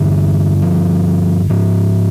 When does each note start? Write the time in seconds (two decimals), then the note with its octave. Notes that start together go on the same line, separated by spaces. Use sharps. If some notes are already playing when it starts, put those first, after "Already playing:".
Already playing: G2 D3 E3
0.62 F3
1.50 G#2 F3